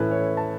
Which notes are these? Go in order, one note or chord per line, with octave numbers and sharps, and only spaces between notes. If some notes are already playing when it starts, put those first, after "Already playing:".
Already playing: A2 E3 C#4 E4 A4 B4
C#5
A5